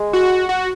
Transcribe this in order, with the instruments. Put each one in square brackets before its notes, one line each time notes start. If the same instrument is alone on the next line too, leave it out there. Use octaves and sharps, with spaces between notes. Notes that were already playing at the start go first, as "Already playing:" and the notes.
Already playing: [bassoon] G#3
[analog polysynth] F#4
F#4